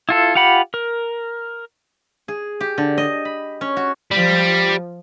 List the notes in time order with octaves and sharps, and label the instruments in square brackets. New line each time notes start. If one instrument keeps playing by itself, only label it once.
[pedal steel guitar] E4 F4 A4
F4 G4 F#5 B5
A#4
[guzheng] G#4
G4
D3
D#5
B5
C#4
F#4
[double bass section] F3 [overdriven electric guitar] G3